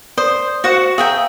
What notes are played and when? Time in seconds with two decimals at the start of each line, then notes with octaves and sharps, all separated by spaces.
0.17 C5 D5 D#6
0.64 F#4 C5 F#5 C#6 E7
0.98 G#4 E5 F5 G5 G#5 A#5